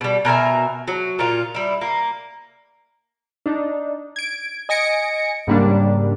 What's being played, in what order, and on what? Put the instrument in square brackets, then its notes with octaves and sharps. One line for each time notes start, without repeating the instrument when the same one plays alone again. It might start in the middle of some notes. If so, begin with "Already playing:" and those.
[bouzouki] B2 G3
B2 A#4 E5 G#5
F#3
A#2 F4
G3 E4
A#3
[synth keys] D4 D#4
G#6 D7
D#5 G#5 A#6 C#7 D7
G#2 C#3 G3 A#3 D4